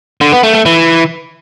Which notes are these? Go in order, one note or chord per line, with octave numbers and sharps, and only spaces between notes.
D3
B3
A3
A3
E3